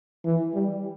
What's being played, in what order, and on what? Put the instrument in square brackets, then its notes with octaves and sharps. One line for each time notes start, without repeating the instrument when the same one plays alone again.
[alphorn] E3
G3